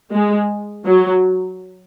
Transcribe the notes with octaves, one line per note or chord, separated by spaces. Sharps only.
G#3
F#3